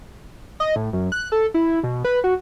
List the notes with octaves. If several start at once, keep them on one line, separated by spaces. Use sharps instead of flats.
D#5
A2
F#2
F#6
A4
E4
B2
B4
F#4